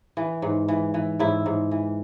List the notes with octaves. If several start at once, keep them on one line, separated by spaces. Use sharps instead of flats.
E3
G#2
E3
E3
G#2 E4
G#2
E3